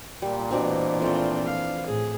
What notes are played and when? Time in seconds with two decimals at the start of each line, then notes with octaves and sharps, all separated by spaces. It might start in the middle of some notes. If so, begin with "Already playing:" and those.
0.22 A#2 G3
0.51 B2 E3 C4 D4
1.00 F3 A3 C4 F4
1.46 F5
1.86 A2 G#4